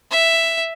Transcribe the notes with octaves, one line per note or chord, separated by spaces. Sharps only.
E5